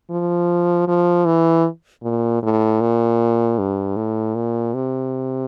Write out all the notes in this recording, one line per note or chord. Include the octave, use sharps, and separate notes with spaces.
F3
F3
E3
A#2
A2
A#2
G2
A2
A#2
C3